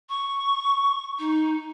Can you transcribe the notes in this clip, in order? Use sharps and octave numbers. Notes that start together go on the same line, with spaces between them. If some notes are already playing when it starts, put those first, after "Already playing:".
C#6
D#4